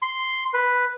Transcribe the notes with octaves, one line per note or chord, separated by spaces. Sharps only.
C6
B4